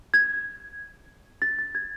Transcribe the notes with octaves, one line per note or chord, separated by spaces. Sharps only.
G#6
A6
A6
G#6